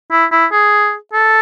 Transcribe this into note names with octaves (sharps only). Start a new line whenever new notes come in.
E4
E4
G#4
A4